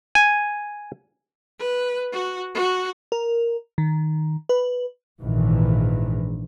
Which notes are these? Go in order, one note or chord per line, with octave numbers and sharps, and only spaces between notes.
G#5
B4
F#4
F#4
A#4
D#3
B4
A#1 G#2 D#3 E3